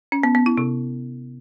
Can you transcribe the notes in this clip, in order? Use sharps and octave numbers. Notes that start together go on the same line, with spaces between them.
C#4
B3
B3
E4
C3